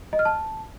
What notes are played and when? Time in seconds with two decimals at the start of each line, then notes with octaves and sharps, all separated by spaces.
0.13 D#5
0.19 F6
0.25 A5